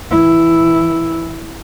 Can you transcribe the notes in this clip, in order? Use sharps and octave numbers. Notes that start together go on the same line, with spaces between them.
E3 E4